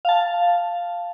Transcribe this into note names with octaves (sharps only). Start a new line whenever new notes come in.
F5 A5